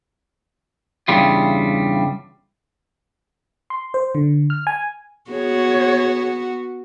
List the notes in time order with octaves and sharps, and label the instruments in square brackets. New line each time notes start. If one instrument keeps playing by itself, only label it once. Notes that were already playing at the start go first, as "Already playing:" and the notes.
[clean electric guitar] E2 G2 C#3 G3 F4
[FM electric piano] C6
C5
D3
F6
G#5
[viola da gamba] B3 F#4 [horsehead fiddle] G#4 C#5